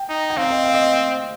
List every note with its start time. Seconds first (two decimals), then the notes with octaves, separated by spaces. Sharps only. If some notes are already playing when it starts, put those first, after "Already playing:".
Already playing: G5
0.09 D#4
0.30 G5
0.37 C4 F5
0.50 D#5
0.65 F5
0.74 D#5